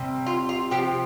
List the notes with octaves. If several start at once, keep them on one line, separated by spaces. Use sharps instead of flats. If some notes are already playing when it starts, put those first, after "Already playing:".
Already playing: C3 G3
F4
F4
C3 F3 G4